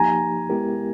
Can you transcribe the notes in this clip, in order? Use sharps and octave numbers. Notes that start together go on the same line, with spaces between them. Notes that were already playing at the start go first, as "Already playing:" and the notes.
Already playing: F3 A#3 D#4 G4 G#5 A#5
G#3 B3 E4 G4 A#4